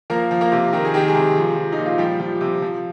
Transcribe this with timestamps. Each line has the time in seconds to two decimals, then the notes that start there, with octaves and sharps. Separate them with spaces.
0.10 F3 A#3 A#4
0.31 F3
0.41 A#3 A#4
0.52 C3
0.73 D#3 A#4
0.85 G#4
0.94 D#3 G4
1.08 G#3 G#4
1.15 C3
1.36 F3
1.56 F3
1.72 A#2 D#4
1.86 F4
1.98 F3 G3 G4
2.20 F3
2.41 C3
2.62 F3